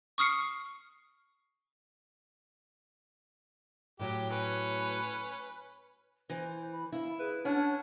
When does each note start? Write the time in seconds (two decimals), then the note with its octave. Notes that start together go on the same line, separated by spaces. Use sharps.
0.18 C#6 D#6 F6 C7 C#7
3.99 A2 F#3 G4
4.30 C#4 B4
6.30 E3 C5
6.72 B5
6.92 E4 F5
7.19 G#4 B4
7.45 C#4 D4 C#5 F#5